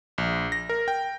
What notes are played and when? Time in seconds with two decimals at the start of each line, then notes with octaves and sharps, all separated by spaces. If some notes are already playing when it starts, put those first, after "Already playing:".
0.18 A#1
0.52 A#6
0.69 A#4
0.88 G5